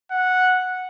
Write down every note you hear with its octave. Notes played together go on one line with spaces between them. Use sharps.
F#5